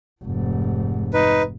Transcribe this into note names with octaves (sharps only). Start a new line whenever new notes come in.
F1 G#2
D#4 B4